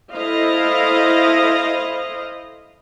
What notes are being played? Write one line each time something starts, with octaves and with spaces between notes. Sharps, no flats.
E4 A4 C5 D#5 F5